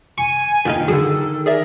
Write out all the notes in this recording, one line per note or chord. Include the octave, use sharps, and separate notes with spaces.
G#5 C#6
A#2 D3 D#3 D#4 G5 F6
D3 F#3 G#4 A4
G#4 A#4 D5 E5